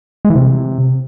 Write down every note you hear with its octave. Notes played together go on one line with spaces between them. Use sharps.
G#3
E3
C3